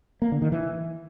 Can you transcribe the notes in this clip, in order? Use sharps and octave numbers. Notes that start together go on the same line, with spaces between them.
A#3
D3
D#3
E3